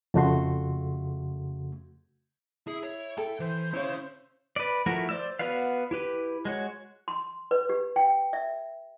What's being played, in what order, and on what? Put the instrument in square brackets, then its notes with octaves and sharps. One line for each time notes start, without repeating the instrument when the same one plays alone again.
[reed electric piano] F2 C#3 A3 F#4 C6
[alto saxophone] E4 [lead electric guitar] G#4
[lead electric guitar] C#5
[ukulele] A4 [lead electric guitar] G5
[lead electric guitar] E3 [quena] C5
[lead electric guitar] C#4 F5 [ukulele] E4 C#5
[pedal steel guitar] B4 D5
F3 A3 E4 F#4 A#4
C5 D5 E6
B3 F#4 B4 D5 F5
E4 G4 B4
G#3 F#4 C#5
[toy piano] C6
B4
G4
G5
E5